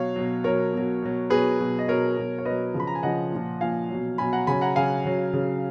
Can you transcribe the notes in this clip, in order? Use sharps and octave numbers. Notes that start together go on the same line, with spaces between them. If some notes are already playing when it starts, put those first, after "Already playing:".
Already playing: B2 F#3 C#5 F5
B2 F#3
B2 F#3 A#4 C#5
B2 F#3
B2 F#3
B2 F#3 G#4 B4
B2 F#3
D#5
B2 F#3 A#4 C#5
B2 F#3
C#5
B2 F#3 B4 D#5
C#3 F3
B5
A#5
G#5
C#3 F3 D#5 F#5
A#2 F3
A#2 F3 F5 G#5
B2 F#3
B2 F#3 G#5 B5
F#5 A#5
C#3 F#3 G#5 B5
F#5 A#5
C#3 F#3 F5 G#5
C#3 F#3
C#3 F#3